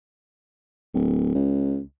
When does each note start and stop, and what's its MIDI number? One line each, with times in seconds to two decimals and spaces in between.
0.94 1.32 26
1.35 1.80 37